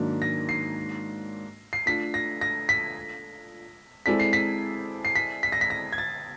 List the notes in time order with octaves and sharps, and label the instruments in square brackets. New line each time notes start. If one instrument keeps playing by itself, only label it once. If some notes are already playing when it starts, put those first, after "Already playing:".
Already playing: [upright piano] G#2 D#3 F#3 A#3 D4
[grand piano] A#6
C7
C7
[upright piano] A3 D4 F4 A4 [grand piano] B6
[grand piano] A#6
A#6
B6
[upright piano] G#3 C4 E4 A4 D5 [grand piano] B6
[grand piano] C7
B6
C7
B6
B6
A#6
B6
A#6
G#6
A6